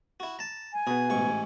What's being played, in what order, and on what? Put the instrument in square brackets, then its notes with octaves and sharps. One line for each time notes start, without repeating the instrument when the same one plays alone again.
[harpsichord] E4 F#4
A5 A#5
[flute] G#5
[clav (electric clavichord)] B2 B3 [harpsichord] G#4
[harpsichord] A1 G#2 C#6